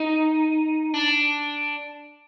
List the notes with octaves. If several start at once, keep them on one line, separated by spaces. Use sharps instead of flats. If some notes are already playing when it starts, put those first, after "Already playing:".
Already playing: D#4
D4